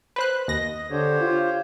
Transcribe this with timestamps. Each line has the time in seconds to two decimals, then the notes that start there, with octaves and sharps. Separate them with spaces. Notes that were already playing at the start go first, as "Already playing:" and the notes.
0.16 B4 C5 F#6
0.48 D#2 D#5 A#6
0.90 D3 G4 C5 C#5
1.21 F4